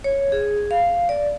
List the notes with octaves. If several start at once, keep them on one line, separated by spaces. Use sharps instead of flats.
C#5
G#4
F5
D5